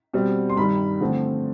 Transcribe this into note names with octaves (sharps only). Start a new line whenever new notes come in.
B2 G3 C4
C6
G2 D#3 G3 B5
D3 F3 A3 C4